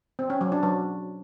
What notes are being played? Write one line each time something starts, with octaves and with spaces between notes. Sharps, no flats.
C4
C#4
F#3
D4
F#3